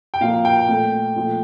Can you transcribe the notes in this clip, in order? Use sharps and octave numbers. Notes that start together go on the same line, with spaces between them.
G5
A#2 F3 A#3 F5
G5
A#2 A3
A#2 F3 A3